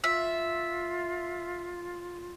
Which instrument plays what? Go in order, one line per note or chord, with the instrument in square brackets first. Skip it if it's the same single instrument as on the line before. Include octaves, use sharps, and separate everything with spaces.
[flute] F4 [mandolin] E5